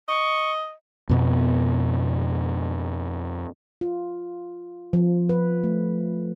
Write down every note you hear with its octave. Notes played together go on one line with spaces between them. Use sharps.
D#5 C#6
F2 B2 B3
F4
F3
B4
A3